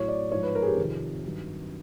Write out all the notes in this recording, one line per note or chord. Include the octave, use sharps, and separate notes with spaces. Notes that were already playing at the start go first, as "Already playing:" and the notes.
Already playing: A2 F#3 C#5
D5
G#2 F3 C#5
B4
A#4
G#4
G4
F2 C3 D#3
G2 D#3 F#3